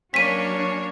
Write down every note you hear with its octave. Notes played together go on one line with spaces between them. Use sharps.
F#3 A#3 C#4 D4 C#5 B6 D#7